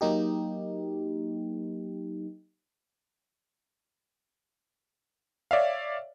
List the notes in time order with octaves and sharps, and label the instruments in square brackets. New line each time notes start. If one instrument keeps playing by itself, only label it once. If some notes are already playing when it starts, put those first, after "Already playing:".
[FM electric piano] F#3 A#3 D#4 G4
[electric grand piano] C#5 D5 E5 F5